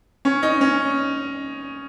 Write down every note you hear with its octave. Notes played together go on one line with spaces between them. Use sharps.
C#4
D#4
C#4